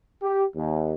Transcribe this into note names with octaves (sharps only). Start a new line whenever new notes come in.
G4
D#2